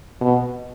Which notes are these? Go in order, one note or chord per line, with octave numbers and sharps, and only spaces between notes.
B2